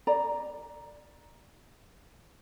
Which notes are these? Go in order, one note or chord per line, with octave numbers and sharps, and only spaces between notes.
D5 A#5